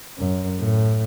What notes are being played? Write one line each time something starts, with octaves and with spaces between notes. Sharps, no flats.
F#2
A2